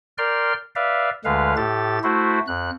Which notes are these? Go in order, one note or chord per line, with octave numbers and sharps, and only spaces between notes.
A#4 D5 G5 C6 F6
B4 D5 E5 F5
D2 D3 G#3 B4 F5
A2 G4 A4 A6
A3 E4 F#4 C5
F2 F#6